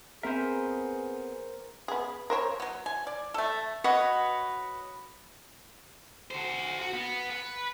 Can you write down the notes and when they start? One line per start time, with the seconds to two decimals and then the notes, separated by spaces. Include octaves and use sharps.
0.23 B3 C4 G#4 A#4 C5 E5
1.88 B3 G#4
2.30 A#4 C5 C#5
2.60 F#3 B3
2.86 G#5
3.07 D5
3.34 A3 A4
3.84 F#4 B4 C#5 D#5
6.31 F#4 C5
6.80 F#4
6.94 B3
7.30 B4